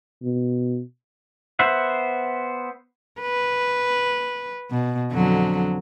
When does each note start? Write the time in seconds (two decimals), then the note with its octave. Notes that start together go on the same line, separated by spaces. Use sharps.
0.22 B2
1.59 B3 C5 E5 F#5
3.21 B4
4.71 B2
5.12 F2 D3 F#3